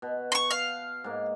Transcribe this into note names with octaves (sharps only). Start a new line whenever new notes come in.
B2
C6 C#6
F5
G#2 A#3